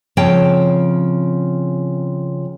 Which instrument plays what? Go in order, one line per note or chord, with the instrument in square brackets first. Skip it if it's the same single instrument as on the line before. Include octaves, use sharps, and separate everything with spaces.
[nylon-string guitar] C#3 F3 C4 C#5 G5 A5